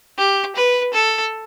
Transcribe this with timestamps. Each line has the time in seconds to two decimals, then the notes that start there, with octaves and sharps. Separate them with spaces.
0.18 G4
0.56 B4
0.94 A4